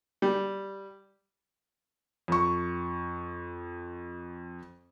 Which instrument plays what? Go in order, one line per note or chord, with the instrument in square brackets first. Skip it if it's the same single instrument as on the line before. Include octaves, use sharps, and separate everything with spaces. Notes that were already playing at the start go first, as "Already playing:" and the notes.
[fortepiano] G3
[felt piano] F2 C#6